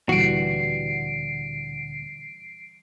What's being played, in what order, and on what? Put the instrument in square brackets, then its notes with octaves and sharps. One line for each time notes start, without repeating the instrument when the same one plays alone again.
[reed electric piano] D2 A#2 D3 [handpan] E3 G3 [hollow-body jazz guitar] F#4 [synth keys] C7 D7